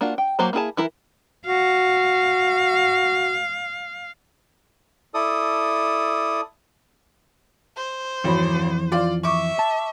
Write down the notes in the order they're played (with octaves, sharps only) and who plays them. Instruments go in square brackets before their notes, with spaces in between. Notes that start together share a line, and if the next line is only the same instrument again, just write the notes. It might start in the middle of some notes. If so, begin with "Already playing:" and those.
[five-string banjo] A#3 D4 F4 F#4
G5
F#3 A#3 C5 A#5
A#3 E4 G#4 A5
E3 E4 A#4
[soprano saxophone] F#4 [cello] F5
[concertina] E4 A4 D5 D#6
[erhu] C5
[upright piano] G#1 F#3 B5 [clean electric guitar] F2 E3
[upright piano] F4 D5
[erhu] E5 [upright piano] C#6 D6
[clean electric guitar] A5